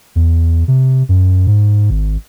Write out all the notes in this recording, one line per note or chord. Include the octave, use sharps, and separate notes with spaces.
E2
C3
F#2
G#2
G#1